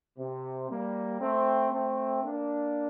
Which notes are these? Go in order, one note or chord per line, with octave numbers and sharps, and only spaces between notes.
C3
G3 A#3
A3 C4
A3 C4
A#3 D4